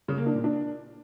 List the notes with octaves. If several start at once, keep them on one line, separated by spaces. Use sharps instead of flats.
C#3
A#3
D4
A#2
D4